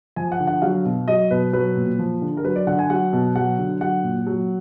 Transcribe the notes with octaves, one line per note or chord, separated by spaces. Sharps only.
F3 G#5
F#5
D3
F#5
F#3 F5
B2
F#3 D#5
B2 B4
F#3 B4
A#2
F3
D3
A#4
F#3 B4
D5
D3 F#5
G#5
F#3 F#5
B2
F#3 F#5
D3
F#3 F#5
A#2
F#3